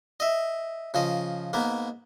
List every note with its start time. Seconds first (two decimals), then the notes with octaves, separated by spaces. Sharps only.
0.20 D#5 E5
0.94 C#3 F3 D#5
1.53 G#2 A#3 B3